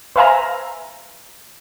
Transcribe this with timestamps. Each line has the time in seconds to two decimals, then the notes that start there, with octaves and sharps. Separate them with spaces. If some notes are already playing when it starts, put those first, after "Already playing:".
0.16 B4 C5 E5 F5 G#5 A#5